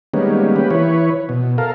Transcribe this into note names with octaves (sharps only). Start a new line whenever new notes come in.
D#3 G3 G#3 A#3 B3 C#4
A#3 G4 B4
E3 B4 C#5
B2
A4 A#4 F5